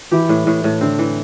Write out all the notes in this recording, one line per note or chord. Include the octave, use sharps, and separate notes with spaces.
E3 E4 G4
A2
A2
A2
D3 C4 D4
E3